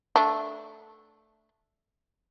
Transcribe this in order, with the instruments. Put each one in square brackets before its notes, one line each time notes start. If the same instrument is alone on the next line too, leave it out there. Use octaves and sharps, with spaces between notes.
[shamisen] A3 D4